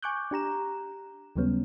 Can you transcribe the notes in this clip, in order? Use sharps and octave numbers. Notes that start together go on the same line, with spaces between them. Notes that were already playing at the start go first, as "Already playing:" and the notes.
G#5 C#6 D6 F#6 G6
D4 G4 A#5 E7
D#2 C#3 F#3 G3 B3 C#4